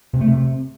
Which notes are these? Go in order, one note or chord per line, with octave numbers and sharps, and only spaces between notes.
C3
A3
C3